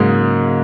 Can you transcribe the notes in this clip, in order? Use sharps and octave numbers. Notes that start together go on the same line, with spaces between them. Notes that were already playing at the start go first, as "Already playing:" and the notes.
Already playing: G#2 C#3 F#3 G#3 A#3